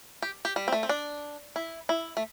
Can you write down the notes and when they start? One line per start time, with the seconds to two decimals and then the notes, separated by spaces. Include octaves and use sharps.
0.22 G4
0.45 G4
0.56 G3
0.68 C4
0.72 A3
0.83 C4
0.89 D4
1.56 E4
1.89 E4
2.17 A3